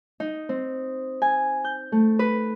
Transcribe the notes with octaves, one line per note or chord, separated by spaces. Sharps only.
D#4
C4
G#5
G6
A3
B4